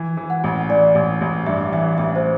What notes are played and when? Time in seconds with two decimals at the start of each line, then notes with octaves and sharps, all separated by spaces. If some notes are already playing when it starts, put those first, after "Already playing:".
Already playing: E3
0.17 E3
0.30 F#5
0.44 A1
0.69 E3 D5
0.95 A1
1.21 A1
1.46 G2 E5
1.72 E3 E5
1.98 A1 E5
2.16 C5